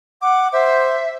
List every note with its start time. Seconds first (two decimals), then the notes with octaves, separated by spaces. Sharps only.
0.22 F#5 D6
0.53 C5 E5